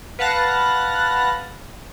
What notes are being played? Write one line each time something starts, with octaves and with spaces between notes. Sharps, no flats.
B4 F5 F#5 A5 F#6 A#6